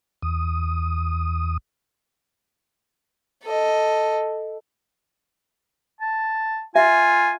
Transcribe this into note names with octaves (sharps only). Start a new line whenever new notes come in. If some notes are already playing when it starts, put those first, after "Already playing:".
E2 D#6
A4 D#5
A5
F4 E5 G#5